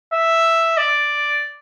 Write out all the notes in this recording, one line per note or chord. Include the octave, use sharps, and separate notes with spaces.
E5
D5